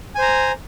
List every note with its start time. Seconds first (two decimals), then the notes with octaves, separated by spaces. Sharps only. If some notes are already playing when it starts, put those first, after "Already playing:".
0.15 G#5
0.18 C5
0.22 A#5